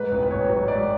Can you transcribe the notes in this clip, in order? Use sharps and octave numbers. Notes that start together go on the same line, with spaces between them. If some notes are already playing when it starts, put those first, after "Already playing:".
Already playing: G#2 B4
A1
B4
A1 C#5
F#3
G#2 D5